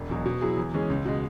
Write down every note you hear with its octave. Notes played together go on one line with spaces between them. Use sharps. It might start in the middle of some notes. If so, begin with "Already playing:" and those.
Already playing: E1
E2 B2 F#3
B2
F#3 E4 G#4
E2
E3 G#3 C#4 G#4
C#2
B2 G#3